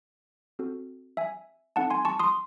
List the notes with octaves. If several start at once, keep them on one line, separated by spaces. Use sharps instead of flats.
C4 F#4 A4
E5 G#5
C4 D#4 A4 F#5 A5
G#5 C6
A5 C#6
C6 D#6